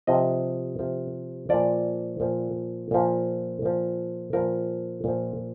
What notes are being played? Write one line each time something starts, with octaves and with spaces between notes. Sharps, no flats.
C3 F3 D#5
C3 F3
A#2 F3 D5
A#2 F3
A#2 F3
A#2 F3
A#2 F3 A#4
A#2 F3